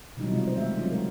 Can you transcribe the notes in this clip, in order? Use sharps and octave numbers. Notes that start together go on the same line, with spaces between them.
B2 D#3 F#3 G3 D#4 E4
C3 D#3 G3 G#3 C4 F4
F4 C5
D#3 G#3 A3 G4 E5
E3 F#3 C4 D#4 F4 F#4
D3 G#3 A#4